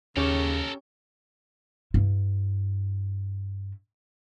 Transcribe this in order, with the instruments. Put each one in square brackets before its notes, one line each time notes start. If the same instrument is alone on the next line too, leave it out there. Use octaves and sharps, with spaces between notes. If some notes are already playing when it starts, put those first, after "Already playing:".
[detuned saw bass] D#2 [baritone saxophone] C#3 [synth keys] C#4 G4 C#5 [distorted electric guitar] A4 A#4
[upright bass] G2 E4